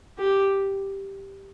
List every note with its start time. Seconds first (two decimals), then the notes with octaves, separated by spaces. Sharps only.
0.18 G4